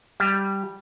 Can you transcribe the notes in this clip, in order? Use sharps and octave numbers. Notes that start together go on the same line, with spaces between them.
G3